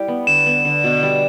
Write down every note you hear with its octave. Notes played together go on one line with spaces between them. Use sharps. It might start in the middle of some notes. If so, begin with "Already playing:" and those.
Already playing: G3 E4 G4
B3
D3 E7
B3
D3
B2
G3